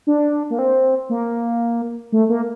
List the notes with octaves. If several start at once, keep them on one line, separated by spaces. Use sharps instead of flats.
D4
A#3
C4
A#3
A3
A#3